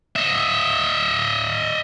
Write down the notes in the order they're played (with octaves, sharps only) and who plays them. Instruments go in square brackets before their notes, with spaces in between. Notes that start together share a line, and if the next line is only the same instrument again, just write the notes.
[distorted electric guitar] D#5 E5